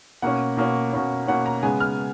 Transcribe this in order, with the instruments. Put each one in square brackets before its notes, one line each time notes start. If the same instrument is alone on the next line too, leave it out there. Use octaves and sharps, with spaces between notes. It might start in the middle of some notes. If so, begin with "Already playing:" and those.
[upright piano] B2 A#3 C#4 F#5
B2 A#3 C#4
B2 A#3 C#4
B2 A#3 C#4 F#5
A#5
C#3 G#3 B3 G#5
F6